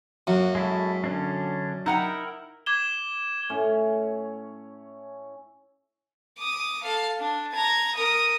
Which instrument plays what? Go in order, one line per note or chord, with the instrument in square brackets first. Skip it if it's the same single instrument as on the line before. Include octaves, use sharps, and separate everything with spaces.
[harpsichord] F#2 [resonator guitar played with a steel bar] A#3 F#4
[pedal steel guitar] G#3 E4 A4
D3 C#4 D4
[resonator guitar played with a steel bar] D#4 F#5 G5 [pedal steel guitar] E4 A#4
[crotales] D6 G#6 E7 G7
[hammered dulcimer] A2 C#4
[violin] D6 D#6
A4 F5
D4
A#5 G#6
A#4 D#6